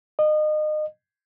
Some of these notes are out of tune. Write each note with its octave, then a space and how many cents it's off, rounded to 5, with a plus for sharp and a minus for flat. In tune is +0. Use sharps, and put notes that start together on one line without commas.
D#5 -30